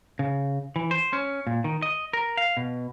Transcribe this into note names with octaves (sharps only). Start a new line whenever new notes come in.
C#3
E3
C5
C#4
A#2
D#3
D#5
A#4
F5
B2